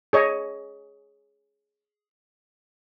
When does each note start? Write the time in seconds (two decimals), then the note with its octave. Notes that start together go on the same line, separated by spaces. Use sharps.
0.13 G#4 C#5 D#5